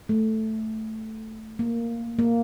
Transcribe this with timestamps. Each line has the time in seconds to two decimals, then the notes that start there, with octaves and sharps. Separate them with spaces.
0.09 A3
1.59 A#3
2.19 A#3